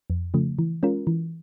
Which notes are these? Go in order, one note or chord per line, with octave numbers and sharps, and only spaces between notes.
F2
C#3 F3 A3
E3
G#3 C#4 F4 A#4
E3